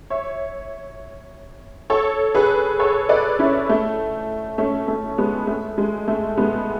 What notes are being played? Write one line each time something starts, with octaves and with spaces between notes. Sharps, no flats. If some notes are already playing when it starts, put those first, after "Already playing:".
C#5 E5
A4 C#5
G#4 B4
A4 C#5
B4 D5
C#4 E4
A3
A3 C#4
A3
G#3 B3
A3
G#3
A3
G#3 B3